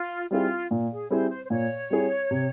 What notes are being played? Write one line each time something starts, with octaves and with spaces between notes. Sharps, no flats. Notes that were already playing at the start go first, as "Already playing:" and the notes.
Already playing: F4
G3 C4 E4 F4 G#4
A#2
G#4
G3 C4 E4 G#4 C5
C5
C5
A#2 C#5
G3 C4 E4 G#4
C3